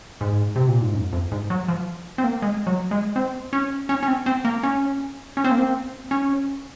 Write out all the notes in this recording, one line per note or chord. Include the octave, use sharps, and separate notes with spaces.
G#2
C3
A#2
G#2
F#2
F2
G#2
F#3
F3
C4
A#3
G#3
F#3
G#3
C4
C#4
C#4
C#4
C4
C4
A#3
C#4
C#4
C4
A#3
C4
C#4